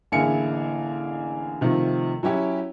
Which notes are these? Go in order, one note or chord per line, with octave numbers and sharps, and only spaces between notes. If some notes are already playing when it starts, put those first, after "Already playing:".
A1 D3 A#3 E4 G#4 C#7
C3 D#3 F3 A3
F#3 C#4 E4 G4